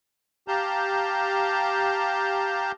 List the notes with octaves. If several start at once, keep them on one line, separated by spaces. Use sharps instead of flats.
G4 F5 A5 A#5 G6